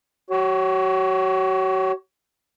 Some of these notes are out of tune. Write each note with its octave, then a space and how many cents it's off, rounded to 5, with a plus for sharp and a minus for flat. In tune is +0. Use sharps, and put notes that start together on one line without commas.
F#4 +40 C#5 +0